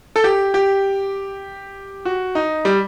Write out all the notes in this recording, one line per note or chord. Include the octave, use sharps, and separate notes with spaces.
A4
G4
G4
F#4
D#4
G3